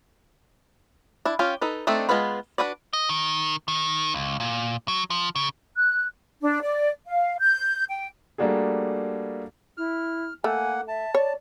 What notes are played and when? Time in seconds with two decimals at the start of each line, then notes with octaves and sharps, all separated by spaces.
1.25 D4 E4
1.39 C#4 F4 G4
1.61 D#4 A4 B4
1.87 A3 C4 D4 D#4 A4
2.09 G#3 B3 F4 B4 B5
2.58 D4 F#4 B4 D5
2.93 D#5
3.09 D#3
3.68 D#3
4.14 C#2
4.40 A#2
4.88 F#3
5.10 F3
5.36 C#3
5.77 F#6
6.42 D4
6.62 D5
7.06 F5
7.40 G6
7.89 G5
8.38 G3 A3 A#3 D4 F#4 G#4
9.77 E4 F6
10.44 A3 A#3 F#5 G#5
10.88 E5 A5
11.15 C#5 D5